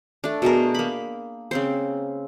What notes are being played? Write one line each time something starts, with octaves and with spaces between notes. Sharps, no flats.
A3 D4
B2 A3 G#4 A#4
A#3 B5
C#3 C4 C5